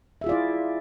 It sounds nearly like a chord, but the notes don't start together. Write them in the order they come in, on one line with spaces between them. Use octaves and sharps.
E5 G#4 F4 D5 E4